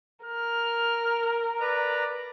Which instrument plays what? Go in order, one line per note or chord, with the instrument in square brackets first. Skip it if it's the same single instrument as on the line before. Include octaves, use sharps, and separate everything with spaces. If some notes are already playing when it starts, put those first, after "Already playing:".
[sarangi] A#4 [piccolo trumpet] F6
[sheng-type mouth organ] B4 A#5 [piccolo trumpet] D5